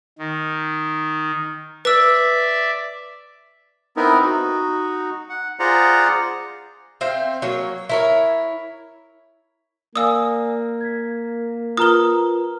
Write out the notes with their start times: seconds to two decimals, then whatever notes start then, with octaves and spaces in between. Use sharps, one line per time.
0.18 D#3
1.85 B4 D5 E5 E6
3.96 B3 C4 D#4 E4 A#4
4.22 D#4 F#4
5.29 F#5
5.60 F4 G#4 C5 D5 F#5 A#5
7.01 C4 E5 F5 G5
7.42 F#3 A#3 C#5
7.89 E4 A#4 C#5
9.96 A#3 D5 F5 G#5 D#6 E6
10.81 G#6 B6
11.77 F4 A#4 B4 A#5 D#6 F6 G7